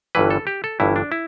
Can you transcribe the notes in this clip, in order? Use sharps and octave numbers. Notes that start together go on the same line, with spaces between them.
G1 G2 E3 B4
A4
G4
A4
G1 G2 E3 E4
D4
E4